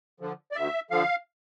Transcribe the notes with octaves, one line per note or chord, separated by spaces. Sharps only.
D3 F3
D5
D2 E5
D3 F3 F5